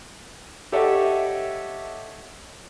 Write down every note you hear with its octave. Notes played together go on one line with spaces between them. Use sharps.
G4 A4 C#5 D#5 E5 F#5